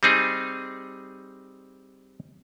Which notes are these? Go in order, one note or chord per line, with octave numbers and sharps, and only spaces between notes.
G3 C4 D#4 G#4